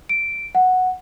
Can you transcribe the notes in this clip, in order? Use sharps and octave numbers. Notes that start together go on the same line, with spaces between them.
D7
F#5